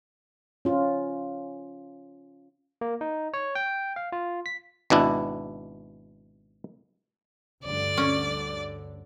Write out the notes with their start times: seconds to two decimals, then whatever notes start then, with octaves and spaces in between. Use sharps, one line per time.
0.65 C#4 F4
2.81 A#3
3.01 D#4
3.34 C#5
3.55 G5
3.96 F5
4.12 F4
4.46 B6
4.90 G#1 B2 D4 E4
7.65 D2 G2 D3 D5
7.97 C#4